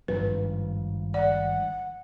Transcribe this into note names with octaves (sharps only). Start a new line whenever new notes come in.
G#1 G2 F3 B4
D5 F#5